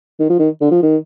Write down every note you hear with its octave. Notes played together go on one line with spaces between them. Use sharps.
D#3
F3
D#3
D3
F3
D#3